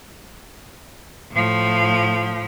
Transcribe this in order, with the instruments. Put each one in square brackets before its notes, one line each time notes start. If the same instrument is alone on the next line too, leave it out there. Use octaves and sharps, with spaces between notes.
[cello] A2 F3